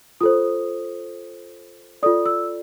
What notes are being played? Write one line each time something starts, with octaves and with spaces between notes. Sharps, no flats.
F4 A4 C5 D#6
F4 A4 D5 D#6
E6